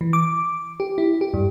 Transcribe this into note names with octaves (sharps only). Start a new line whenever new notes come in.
E3
D6
G4
E4
G4
G2